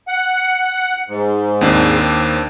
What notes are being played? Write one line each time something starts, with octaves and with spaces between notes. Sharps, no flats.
F#5
G#2
D#2 C4 D4